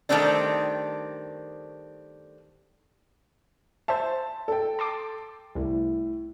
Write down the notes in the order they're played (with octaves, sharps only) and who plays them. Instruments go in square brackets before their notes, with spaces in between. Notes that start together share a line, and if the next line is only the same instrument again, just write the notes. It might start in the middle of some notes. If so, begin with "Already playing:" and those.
[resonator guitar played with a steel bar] D#3 F#3 G3 A3 C4 D4
[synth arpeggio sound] C5 E5 [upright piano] A5
[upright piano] A4 G5
[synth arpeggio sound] A5 C6 D6
[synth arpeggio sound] C2 [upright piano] A2